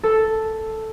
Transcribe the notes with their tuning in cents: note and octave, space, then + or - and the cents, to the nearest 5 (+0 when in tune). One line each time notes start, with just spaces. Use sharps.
A4 +0